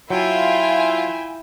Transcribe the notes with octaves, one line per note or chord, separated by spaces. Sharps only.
F#3 E4 F4 E5 G5 G#5